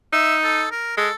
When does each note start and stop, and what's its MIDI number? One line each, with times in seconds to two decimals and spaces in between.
0.13 0.65 63
0.13 0.35 76
0.44 0.68 69
0.71 0.96 70
0.97 1.08 56
0.97 1.14 69